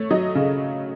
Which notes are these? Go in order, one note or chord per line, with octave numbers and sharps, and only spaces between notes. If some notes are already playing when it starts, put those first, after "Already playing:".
Already playing: A3 C#5
F#3 D#5
C#3